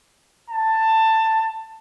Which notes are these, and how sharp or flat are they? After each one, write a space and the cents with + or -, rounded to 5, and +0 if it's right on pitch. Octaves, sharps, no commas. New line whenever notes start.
A5 +15